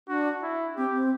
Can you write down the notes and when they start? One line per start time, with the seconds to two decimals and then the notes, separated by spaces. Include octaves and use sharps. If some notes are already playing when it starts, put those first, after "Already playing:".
0.08 D4 F#4
0.43 E4
0.77 C4 G4
0.94 C4